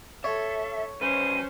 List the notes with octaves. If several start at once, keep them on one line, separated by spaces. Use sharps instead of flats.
A4 C#5 E5
F#2 C#4 B4 C5 D#7